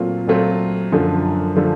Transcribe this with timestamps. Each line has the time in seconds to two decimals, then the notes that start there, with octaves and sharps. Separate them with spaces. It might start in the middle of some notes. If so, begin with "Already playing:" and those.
Already playing: A#2 F#3 A3 C4 F4
0.27 A#2 F#3 A3 C4 F4
0.92 F#2 D3 F3 A3
1.56 D3 F3 A3